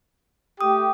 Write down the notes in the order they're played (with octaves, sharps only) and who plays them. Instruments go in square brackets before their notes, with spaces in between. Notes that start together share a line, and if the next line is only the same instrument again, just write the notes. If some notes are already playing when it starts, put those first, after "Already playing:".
[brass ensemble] A3 G4 [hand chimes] D#6